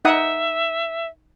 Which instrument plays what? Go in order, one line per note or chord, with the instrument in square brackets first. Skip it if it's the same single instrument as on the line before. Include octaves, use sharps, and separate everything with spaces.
[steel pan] D#4 F#5 D#6 [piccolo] E5